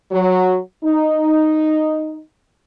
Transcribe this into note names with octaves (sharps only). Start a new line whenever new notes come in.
F#3
D#4